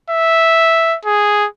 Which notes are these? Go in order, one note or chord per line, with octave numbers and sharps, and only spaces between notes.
E5
G#4